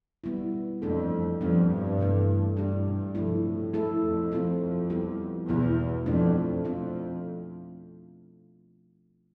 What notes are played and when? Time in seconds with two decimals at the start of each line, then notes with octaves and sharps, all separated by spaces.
0.24 G3 B3 E4
0.82 F2 E3 A3 D4 A4
1.41 F2 G3 B3 D4
1.70 G2
1.99 C3 E3 A3
2.57 G2 G3 D4 G4
2.86 G2
3.15 C3 F3 A3 E4
3.44 A2
3.73 A3 E4 A4
4.02 F2
4.32 F3 C4 F4 A4
4.61 F2
4.90 G3 B3 E4 G4
5.48 E2 B2 B3 E4
6.06 F2 F3 A3 D4
6.64 F2 A3 C4 F4